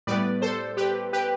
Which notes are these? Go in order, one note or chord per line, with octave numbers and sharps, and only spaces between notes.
A2 G3 B3 B4 D5
A4 C5
G4 B4
G4 B4